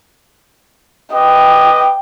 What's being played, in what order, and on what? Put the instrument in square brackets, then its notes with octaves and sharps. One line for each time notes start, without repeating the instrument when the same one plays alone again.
[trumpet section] B4 D#5 D6 [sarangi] G5